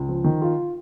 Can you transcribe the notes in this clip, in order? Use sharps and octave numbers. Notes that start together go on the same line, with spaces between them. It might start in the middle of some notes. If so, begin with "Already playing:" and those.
Already playing: C#2
F3
D#3
F4